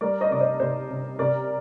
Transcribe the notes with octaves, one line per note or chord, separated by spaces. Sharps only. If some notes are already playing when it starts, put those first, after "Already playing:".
G3 A#4 D5
C5 D#5
C3 D5
C5 D#5
C3 C5
C3
C3 A#4 D5